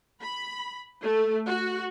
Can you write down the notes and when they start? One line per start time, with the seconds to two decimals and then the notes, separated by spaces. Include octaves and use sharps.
0.21 B5
1.02 A3
1.47 F#4